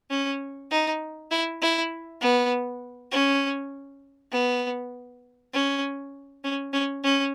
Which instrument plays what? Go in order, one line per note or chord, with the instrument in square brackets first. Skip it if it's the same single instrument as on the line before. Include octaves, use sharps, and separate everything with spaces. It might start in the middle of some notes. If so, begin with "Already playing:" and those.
[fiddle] C#4
D#4
E4
E4
B3
C#4
B3
C#4
C#4
C#4
C#4